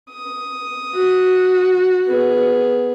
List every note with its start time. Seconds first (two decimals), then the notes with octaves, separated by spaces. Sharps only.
0.10 D#6
0.95 F#4
2.06 B3 G#4